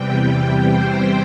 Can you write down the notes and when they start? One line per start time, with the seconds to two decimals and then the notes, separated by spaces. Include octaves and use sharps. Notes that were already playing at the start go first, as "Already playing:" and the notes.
Already playing: E2 C3 E3 G3 G5
0.69 C5